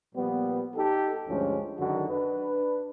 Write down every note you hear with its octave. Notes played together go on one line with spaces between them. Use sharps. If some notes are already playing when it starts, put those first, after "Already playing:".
A#2 F3 G3 B3
D#4 G4 A4
D2 G2 F3 G#3 C#4
F#2 D3 D#3 D#4 F#4
D4 B4